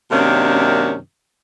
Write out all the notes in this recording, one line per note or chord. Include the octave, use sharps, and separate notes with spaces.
F#2 C3 D#3 A#3 C#4 D4